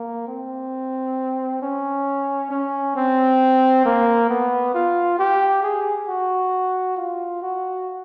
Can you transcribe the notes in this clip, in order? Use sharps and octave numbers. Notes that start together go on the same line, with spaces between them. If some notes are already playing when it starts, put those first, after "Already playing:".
Already playing: A#3
C4
C#4
C#4
C4
A#3
B3
F4
G4
G#4
F#4
F4
F#4